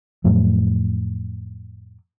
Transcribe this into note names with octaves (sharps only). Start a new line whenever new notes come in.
F2 A2 F#3